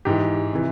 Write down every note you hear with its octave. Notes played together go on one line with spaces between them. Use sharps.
G#2 E3 G4
C3 E3